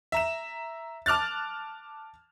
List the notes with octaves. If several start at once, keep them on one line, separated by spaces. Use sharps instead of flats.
E5 A#5 E7
A5 D6 F6 F#6 A6